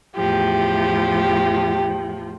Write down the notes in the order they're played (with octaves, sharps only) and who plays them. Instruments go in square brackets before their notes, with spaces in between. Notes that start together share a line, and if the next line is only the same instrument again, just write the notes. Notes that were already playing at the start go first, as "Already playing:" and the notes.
[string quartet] E2 A2 F3 [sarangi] G4